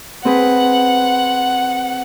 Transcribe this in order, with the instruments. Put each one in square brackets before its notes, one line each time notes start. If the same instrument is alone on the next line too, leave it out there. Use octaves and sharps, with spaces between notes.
[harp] C4 G#4 B4 [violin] F#5